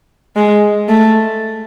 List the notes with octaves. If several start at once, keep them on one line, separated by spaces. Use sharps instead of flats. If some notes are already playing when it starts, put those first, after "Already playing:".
G#3
A3